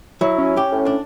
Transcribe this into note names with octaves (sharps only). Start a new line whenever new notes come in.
F#3 E4
C#4
G4
A2
D4